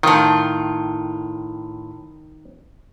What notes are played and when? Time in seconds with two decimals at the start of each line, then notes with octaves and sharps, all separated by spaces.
0.03 A2 D#3 F4